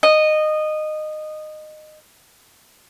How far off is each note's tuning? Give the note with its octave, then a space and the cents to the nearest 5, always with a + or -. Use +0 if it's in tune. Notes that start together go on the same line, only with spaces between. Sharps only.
D#5 -15